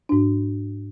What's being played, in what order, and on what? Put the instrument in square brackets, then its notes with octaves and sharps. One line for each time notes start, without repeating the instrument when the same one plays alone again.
[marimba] G#2 D4